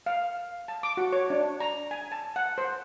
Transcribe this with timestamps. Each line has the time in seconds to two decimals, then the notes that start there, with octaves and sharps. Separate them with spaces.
0.06 F5
0.68 A5
0.83 D6
0.97 F#4
1.13 C#5
1.30 D4
1.60 A#5
1.91 G#5
2.12 A5
2.36 F#5
2.58 C5